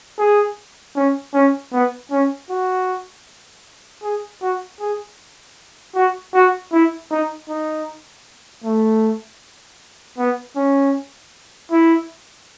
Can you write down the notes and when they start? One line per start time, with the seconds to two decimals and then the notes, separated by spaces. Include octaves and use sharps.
0.19 G#4
0.96 C#4
1.34 C#4
1.72 B3
2.11 C#4
2.50 F#4
4.03 G#4
4.42 F#4
4.80 G#4
5.95 F#4
6.34 F#4
6.72 E4
7.11 D#4
7.49 D#4
8.64 A3
10.18 B3
10.56 C#4
11.72 E4